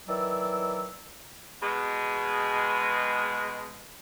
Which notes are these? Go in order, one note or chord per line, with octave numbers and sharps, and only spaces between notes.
D#3 E3 F#3 D5 E6
B2 G#3